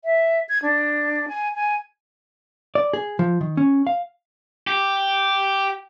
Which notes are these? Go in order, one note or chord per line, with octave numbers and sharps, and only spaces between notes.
E5
G#6
D4
G#5
G#5
D5
G#4
F3
D#3
C#4
F5
G4